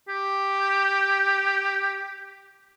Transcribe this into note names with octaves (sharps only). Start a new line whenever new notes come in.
G4